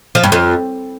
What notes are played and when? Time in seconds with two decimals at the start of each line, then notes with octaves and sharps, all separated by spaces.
0.15 F3
0.24 G2
0.32 F2